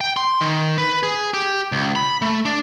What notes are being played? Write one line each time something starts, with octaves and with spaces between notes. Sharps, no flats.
G5
C6
D#3
B4
G#4
G4
C#2
B5
A3
D4